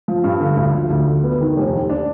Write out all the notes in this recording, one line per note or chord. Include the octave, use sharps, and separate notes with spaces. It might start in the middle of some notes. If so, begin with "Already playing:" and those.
F3
G2
D3
D2
F3
D2
D3
B3
D#3
F1
D#2
D4